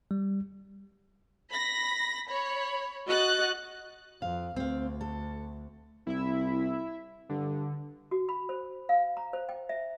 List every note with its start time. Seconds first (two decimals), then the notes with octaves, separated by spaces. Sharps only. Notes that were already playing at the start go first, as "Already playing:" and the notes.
0.11 G3
1.51 B5 A#6
2.30 C#5 B5
3.06 F#4 D#5 F#6 A6
4.22 F2 F5
4.56 D2 C4 F5
5.01 A4
6.07 C2 E4 E5
7.29 G2 D3
8.11 F#4
8.29 B5
8.49 C5
8.89 F5
9.17 A#5
9.33 C5
9.49 G5
9.69 E5